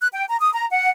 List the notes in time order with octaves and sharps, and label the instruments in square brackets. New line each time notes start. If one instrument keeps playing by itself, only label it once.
[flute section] F#6
G5
A#5
D#6
A#5
F#5